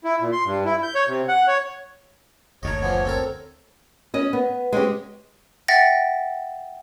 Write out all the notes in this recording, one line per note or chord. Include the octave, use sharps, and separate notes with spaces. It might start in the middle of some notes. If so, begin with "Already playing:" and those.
E4
A#2
C6
G2
E4
G6
C#5
C3
F#5
C#5
F#1 D2 C#5 D#5 A#5
E3 F3 B3
C4 A4 A#4
C#4 D#5
B3
G#3 C4 C#4 G4
E5 F#5 G5 A6 A#6